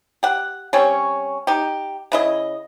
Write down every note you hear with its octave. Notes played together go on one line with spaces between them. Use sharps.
G4 F#5
G3 C4 C#4 C#5
D#4 G4
C#3 E4 D#5